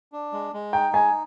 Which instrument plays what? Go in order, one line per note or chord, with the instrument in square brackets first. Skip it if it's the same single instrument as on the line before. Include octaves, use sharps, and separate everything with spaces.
[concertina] D4
G#3
G#3
[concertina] D#4 [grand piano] G5
[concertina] G#3 [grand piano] G#5